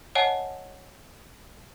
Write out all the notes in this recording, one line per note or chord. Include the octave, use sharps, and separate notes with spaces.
C#5 D#5 F#5 G#5 A5